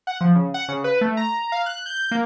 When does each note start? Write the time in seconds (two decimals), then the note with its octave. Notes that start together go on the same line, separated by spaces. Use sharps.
0.07 F#5
0.21 F3
0.35 C#3
0.54 F#5
0.68 C#3
0.84 B4
1.01 A3
1.17 A#5
1.52 F5
1.66 F#6
1.86 G6
2.11 A#3